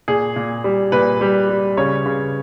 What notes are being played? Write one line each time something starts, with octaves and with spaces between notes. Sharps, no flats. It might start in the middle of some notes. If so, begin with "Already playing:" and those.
A#2 G#4
A#2
G3
A#2 B4
G3
G3
C#3 C#5
C#3